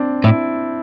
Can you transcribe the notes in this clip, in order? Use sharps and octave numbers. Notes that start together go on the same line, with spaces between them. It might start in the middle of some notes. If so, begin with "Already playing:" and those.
Already playing: C4 D4
A2 E4